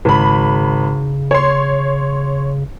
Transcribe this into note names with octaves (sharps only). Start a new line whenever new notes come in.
G#1 C#3 B5
C#5 C6